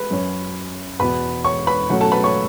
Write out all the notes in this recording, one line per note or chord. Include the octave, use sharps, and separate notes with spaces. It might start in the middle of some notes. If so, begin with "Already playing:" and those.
Already playing: B4 B5
F#2 F#3 C#4
E2 B2 B3 B4 B5
C#5 C#6
B4 B5
B2 F#3 A3 C#4 F#4 F#5
A4 A5
B4 B5
C#5 C#6